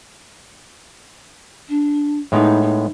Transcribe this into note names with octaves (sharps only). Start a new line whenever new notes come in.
D4
A2 G#3 B3 D#4
D#4